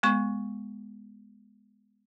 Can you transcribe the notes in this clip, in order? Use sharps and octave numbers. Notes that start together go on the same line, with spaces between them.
G#3 B3 C#6